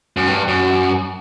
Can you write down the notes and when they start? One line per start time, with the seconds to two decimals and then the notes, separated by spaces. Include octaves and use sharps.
0.17 F#2
0.27 G2
0.48 F#2